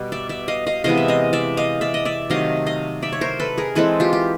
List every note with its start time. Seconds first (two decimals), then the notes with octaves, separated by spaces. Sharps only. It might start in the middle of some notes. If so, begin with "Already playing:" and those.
Already playing: B2 G3 B3
0.12 D5 E5
0.29 D5 E5
0.48 D#5 F5
0.67 D#5 F5
0.84 C3 E3 G#3 B3 D#5 F5
0.97 E5
1.08 D#5 F5
1.33 D5 E5
1.57 D#5 F5
1.81 D5 E5
1.94 D#5
2.05 D5 E5
2.30 C3 D#3 F#3 A3 D#5 F5
2.66 D#5 F5
3.02 D5 E5
3.13 C#5
3.21 A#4 C5
3.40 A4 B4
3.58 G#4 A#4
3.75 E3 G#3 C4 A4 B4
4.00 F4 G4
4.13 G4